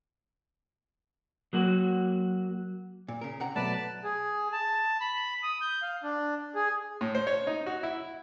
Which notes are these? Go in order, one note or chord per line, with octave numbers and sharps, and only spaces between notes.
F#3 A#3 F#4
A#2
C#3 A#4
C3 F#5 A#5
B2 F#3 A3 B3 B4 D5 A5
G#4
A5
B5
D#6
G6
F5
D4
G#4
A2
C5
C#5
D#4
F#4
E4